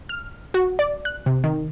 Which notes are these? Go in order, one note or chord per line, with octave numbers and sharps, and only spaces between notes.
F6
F#4
D5
F#6
C3
D#3